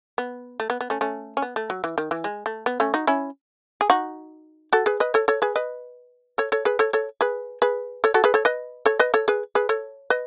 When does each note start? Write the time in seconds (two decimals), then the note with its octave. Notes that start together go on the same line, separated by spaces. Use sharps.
0.18 B3
0.60 A3
0.70 B3
0.81 B3
0.90 A3 C#4
1.01 A3 C#4
1.37 C#4
1.42 B3
1.56 A3
1.70 F#3
1.84 E3
1.98 D#3
2.11 E3
2.24 G#3
2.46 A3
2.66 B3
2.80 A3 C#4
2.94 D#4 F#4
3.07 C#4 E4
3.81 G#4
3.90 D#4 F#4
4.73 F#4 A4
4.86 G#4 B4
5.00 B4 D#5
5.14 A4 C#5
5.28 A4 C#5
5.42 G#4 B4
5.56 B4 D#5
6.38 A4 C#5
6.52 A4 C#5
6.65 G#4 B4
6.79 A4 C#5
6.93 A4 C#5
7.21 G#4 B4
7.62 G#4 B4
8.04 A4 C#5
8.14 F#4 A4
8.24 G#4 B4
8.34 A4 C#5
8.45 B4 D#5
8.86 A4 C#5
8.99 B4 D#5
9.14 A4 C#5
9.28 G#4 B4
9.55 G#4 B4
9.69 A4 C#5
10.10 B4 D#5